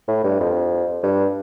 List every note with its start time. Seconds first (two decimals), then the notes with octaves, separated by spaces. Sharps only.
0.08 A2
0.24 G2
0.40 F2
1.03 G2